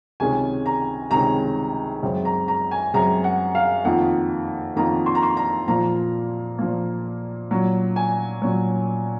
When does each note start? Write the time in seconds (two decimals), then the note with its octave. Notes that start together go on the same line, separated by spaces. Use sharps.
0.20 C#2 C3 D#3 G#3 C#4 G#5
0.66 A#5
1.11 C#2 C3 D#3 G#3 C#4 A#5
2.03 F#2 C#3 G#3 C4
2.25 A#5
2.48 A#5
2.71 G#5
2.94 F#2 C#3 G#3 C4 A#5
3.24 F#5
3.55 F5
3.85 F2 D#3 A#3 F4 F#5
4.76 F2 D#3 A#3 F4 A#5
5.06 C6
5.15 A#5
5.23 C6
5.37 A#5
5.68 A#2 F3 A#3 A#5
6.58 A#2 F3 A#3
7.51 A#2 F#3 C#4
7.96 G#5
8.42 A#2 F#3 C#4